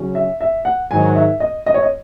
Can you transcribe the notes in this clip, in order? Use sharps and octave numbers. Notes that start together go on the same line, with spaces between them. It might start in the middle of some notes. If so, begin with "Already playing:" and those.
Already playing: C#3 F#3 C#4
E5
E5
F#5
G#2 D#3 F#3 G#5
E5
D#5
D#5
C#5
D#5